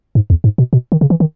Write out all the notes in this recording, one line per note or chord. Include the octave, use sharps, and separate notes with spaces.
G#2
E2
G#2
B2
B2
D#3
C#3
E3
D#3